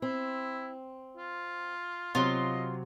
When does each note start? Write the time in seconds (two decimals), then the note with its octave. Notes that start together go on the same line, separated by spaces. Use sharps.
0.02 C4 E4
1.17 F4
2.15 C3 F#3 F4 D#5